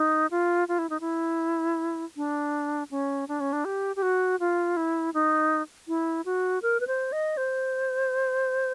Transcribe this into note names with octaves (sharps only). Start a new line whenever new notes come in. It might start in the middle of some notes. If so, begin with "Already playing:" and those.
Already playing: D#4
F4
F4
E4
D#4
E4
D4
C#4
D4
C#4
D4
G4
G4
F#4
F4
E4
D#4
E4
F#4
A#4
B4
C5
D#5
C5